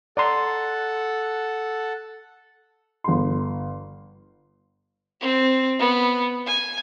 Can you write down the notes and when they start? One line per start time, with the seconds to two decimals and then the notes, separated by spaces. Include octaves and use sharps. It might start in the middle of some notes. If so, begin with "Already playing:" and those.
0.17 A4 D5 F#5 A#5 C6
3.04 G1 C6
5.21 C4
5.79 B3
6.47 G#5